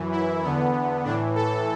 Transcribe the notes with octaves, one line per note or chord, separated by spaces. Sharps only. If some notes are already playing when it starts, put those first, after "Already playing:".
Already playing: F#2 E3
E4
E2 D3 B3
A2 E3 D4
A4